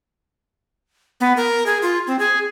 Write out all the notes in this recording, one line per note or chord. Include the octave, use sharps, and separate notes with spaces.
B3
A#4
G#4
F4
C4
G#4